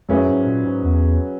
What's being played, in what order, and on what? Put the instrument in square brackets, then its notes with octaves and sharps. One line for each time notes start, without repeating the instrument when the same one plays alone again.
[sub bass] F#2 [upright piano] F#3 C#4 E4 G#4 B4
[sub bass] G#2
A#2
G#2
E2